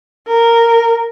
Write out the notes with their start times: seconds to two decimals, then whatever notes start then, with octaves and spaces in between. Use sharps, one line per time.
0.28 A#4